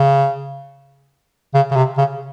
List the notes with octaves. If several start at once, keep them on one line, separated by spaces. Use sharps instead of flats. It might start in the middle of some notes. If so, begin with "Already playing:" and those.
Already playing: C#3
C#3
C#3
C3
C#3